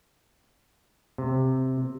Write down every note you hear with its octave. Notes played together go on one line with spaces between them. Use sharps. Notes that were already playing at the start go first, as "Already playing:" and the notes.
C3